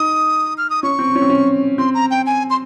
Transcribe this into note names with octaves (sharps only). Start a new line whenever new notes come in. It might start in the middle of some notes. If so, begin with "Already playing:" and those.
Already playing: D#4 D#6
F6
D#6
C#4 C#6
C4
C#4
C4
C#4
C4 C6
A#5
G5
G#5
C6